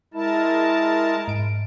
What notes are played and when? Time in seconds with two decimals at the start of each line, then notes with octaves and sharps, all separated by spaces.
0.14 G#3 E4 A#4 A5
1.28 G#2 D7